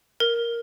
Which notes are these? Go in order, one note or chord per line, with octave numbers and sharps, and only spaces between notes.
A#4